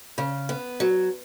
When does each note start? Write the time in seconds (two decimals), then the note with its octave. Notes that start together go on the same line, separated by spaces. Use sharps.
0.18 C#3
0.49 B3
0.80 F#3